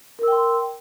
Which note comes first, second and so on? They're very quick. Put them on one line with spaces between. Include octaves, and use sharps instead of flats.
A#4 E6 G5 C6